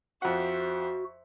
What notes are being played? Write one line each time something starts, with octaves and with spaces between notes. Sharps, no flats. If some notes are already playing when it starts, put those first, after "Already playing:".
F2 F#4 C5 E5 F#5